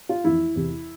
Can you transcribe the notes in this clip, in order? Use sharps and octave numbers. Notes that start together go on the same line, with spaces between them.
F4
F2 E3 E4
E2 C3 E3